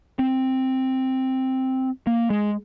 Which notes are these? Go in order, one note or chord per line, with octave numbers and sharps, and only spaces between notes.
C4
A#3
G#3